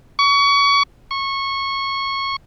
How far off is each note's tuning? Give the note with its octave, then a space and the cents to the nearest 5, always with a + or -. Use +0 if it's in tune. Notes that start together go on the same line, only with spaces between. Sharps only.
C#6 +30
C#6 -20